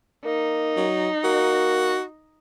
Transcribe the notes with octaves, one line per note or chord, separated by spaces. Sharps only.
A#3 D#4
F#3
A#3 F#4